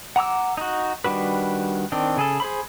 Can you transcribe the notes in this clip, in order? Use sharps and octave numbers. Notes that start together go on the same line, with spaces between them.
F#5 A#5 D6 E6
D#4 F#4
D#3 G3 D4 F#4 B4
D#3 C4 D4
C#3 G#4 A4
G#4 C5 B5